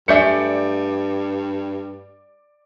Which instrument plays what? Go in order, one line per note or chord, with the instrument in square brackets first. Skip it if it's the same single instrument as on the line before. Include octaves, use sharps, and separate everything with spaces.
[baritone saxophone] G2 [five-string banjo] A3 G#4 E5 [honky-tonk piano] D5 G6 C#7